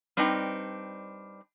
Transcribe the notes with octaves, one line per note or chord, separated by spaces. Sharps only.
G3 C4 D4 D#4 B4 G5